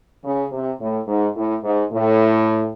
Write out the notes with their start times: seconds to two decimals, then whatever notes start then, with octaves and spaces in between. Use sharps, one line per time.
0.24 C#3
0.51 C3
0.80 A2
1.08 G#2
1.35 A2
1.63 G#2
1.91 A2